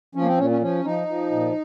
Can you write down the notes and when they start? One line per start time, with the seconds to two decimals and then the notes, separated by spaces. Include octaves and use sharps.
0.15 F3 C#4
0.22 A#3
0.27 C4
0.38 A#2 C#4
0.50 C#4
0.61 F3 C#4
0.85 F3 D#4
1.08 F3
1.31 A#2